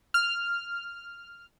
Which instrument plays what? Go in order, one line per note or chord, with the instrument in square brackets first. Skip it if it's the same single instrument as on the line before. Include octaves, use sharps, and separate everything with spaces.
[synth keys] F6